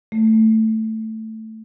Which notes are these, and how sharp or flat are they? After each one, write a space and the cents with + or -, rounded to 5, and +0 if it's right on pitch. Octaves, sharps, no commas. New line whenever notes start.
A3 +5